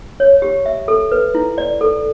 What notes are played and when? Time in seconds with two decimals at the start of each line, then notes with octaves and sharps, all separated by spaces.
0.20 C#5
0.42 G4
0.66 E5
0.88 A4
1.12 B4
1.35 E4
1.58 D5
1.81 A4